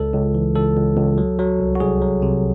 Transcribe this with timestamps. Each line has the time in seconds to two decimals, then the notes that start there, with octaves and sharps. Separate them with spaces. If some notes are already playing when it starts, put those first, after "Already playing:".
Already playing: C#2 A4
0.14 C#2
0.35 E3
0.55 C#2 A4
0.76 C#2
0.97 C#2
1.18 F#3
1.39 F#3
1.60 C2
1.75 F#4
1.80 C2 G#4
2.02 F#3
2.22 C3